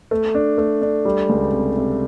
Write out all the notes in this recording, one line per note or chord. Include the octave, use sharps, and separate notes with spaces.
A3
D4
A3
D4
G3
C#2
C3
C3